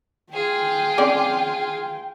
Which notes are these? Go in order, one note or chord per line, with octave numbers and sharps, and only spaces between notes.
F4 G#4 G5
C4 C#4 D5